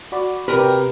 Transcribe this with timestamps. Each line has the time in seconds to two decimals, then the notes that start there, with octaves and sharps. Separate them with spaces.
0.12 F#4 D5 B5
0.48 C3 G4 A#4 B4